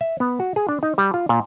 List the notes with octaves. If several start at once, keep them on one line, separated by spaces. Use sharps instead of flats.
E5
B3
F#4
G#4
D4
D#4
G3
F4
A#2